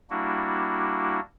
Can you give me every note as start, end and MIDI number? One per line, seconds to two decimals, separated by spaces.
0.10 1.20 55
0.10 1.20 58
0.10 1.20 62
0.10 1.20 64
0.10 1.20 66